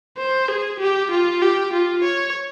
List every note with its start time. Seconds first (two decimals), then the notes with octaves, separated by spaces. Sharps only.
0.18 C5
0.48 G#4
0.80 G4
1.11 F4
1.42 G4
1.73 F4
2.04 C#5